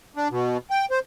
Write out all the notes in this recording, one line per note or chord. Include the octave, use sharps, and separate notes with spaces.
D4
B2
G5
C5